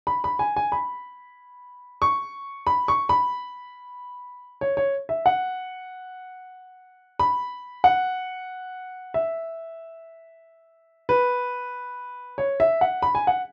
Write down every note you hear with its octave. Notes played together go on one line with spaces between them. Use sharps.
B5
B5
G#5
G#5
B5
C#6
B5
C#6
B5
C#5
C#5
E5
F#5
B5
F#5
E5
B4
C#5
E5
F#5
B5
G#5
F#5